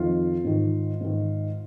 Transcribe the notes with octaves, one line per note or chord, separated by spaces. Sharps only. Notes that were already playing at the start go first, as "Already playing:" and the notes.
Already playing: F2 D#3 F4
G#2 D#3
G#2 D#3